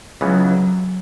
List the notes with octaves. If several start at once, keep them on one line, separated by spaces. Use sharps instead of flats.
C#2 C#3 E3 F#3 B3